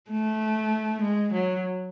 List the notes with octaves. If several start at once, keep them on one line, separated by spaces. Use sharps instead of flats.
A3
G#3
F#3